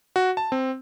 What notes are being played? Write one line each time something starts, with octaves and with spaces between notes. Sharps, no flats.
F#4
A5
C4